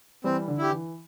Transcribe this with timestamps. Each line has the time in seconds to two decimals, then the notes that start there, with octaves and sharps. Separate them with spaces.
0.24 E3 G3 C4
0.48 D3
0.58 E4 G4
0.70 E3